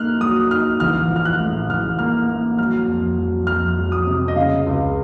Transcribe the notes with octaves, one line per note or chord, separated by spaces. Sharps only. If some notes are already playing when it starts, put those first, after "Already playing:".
Already playing: A#3 D#4 F6 F#6
F#3 D#6
D#4 F6
A1 F6
F3
F6
F#6
A2
A1 F6
A#3 F6
A#3
F#3 F6
F2
F#3
F2 F6
F#3
D#6
C3
D#5
C#3 F5
C#2